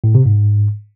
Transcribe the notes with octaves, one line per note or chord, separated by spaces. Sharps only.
A2
C3
G#2